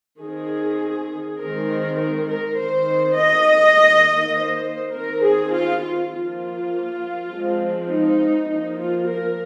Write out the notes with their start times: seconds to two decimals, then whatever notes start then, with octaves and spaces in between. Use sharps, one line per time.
0.22 D#3 C4 G#4
1.41 D#3 G#3 C4 A#4
2.00 A#4
2.29 A#4
2.58 D#3 C4 C5
3.18 D#5
3.78 D#3 A#3
4.36 C5
4.95 D#3 C4 A#4
5.25 G#4
5.54 F4
5.83 F4
6.13 F3 A#3 F4
7.31 F3 G#3 C4
7.90 D#4
8.49 F3 A#3 D#4
8.79 F4
9.08 A#4